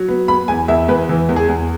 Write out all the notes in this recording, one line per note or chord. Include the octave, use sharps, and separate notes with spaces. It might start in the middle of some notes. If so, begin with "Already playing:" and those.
Already playing: F#3
B3
B3 B5
E2 G#5
E2 E5
E2 B4
E3
E2
G#4
E2